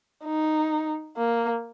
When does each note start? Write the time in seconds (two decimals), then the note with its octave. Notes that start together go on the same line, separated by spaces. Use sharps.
0.25 D#4
1.17 A#3